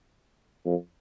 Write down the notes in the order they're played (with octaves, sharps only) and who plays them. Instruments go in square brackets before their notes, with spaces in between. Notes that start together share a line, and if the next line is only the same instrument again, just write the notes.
[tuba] F2